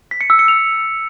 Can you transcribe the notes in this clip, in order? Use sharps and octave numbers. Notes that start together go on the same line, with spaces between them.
B6
C#7
E6
C#7
F7